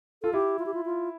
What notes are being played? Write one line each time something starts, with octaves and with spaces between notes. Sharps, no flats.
F4 A4
E4 G4
F4
G4
F4
F4